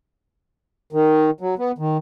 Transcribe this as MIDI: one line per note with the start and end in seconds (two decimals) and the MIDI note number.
0.93 1.30 51
1.41 1.55 54
1.58 1.72 59
1.78 1.97 51